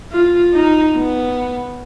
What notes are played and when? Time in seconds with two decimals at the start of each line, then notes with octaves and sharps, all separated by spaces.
0.12 F4
0.53 D#4
0.95 B3